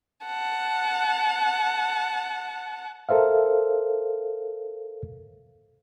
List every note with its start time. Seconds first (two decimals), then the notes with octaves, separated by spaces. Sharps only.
0.26 F#5 A5
3.09 A4 A#4 C5 E5 F5